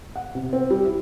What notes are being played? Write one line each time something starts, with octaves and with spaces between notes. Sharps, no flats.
F#5
C3
C4
G3
E4